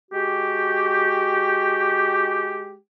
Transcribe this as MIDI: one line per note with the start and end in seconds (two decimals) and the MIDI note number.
0.11 2.76 56
0.11 2.76 66
0.11 2.76 67